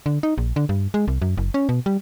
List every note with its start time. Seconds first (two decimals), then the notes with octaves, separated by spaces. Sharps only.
0.06 D3
0.23 D#4
0.38 A#1
0.56 D3
0.69 G2
0.94 G#3
1.08 C2
1.22 F#2
1.37 F#1
1.54 C#4
1.69 B2
1.86 G3